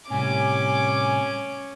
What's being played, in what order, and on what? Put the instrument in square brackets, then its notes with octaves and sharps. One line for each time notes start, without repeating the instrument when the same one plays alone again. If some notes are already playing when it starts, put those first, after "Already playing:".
[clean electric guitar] A2 C3 G3 [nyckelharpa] C#4 [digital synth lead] G#5 [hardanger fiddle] D6